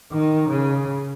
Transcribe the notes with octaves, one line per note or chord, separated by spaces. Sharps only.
D#3
C#3